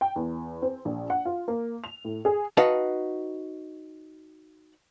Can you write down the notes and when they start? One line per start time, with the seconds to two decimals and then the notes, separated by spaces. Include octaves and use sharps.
0.01 G5
0.16 E2
0.62 C4
0.85 A#1
1.10 F#5
1.25 F4
1.48 A#3
1.84 F7
2.05 A2
2.25 G#4
2.57 D#4 F#4 B4 F5 F#5 A5